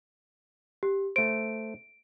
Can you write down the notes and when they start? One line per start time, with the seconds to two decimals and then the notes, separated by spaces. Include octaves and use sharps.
0.83 G4
1.16 A3 C5 D7